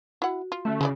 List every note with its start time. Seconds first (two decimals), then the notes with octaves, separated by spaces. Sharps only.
0.22 E4 F#4 F#5
0.52 F4
0.65 D3 A3 C#4
0.81 C#3 G#3 E4 D5